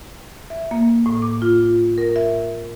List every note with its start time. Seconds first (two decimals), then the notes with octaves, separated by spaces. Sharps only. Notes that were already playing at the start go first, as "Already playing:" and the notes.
0.50 E5
0.71 A#3
1.06 A2
1.22 D6
1.42 F4
1.98 A#4
2.16 E5